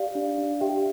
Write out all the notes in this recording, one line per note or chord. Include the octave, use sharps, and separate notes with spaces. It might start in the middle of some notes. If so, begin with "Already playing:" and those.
Already playing: G4 D5 F5
D4
D4
G4 E5 G5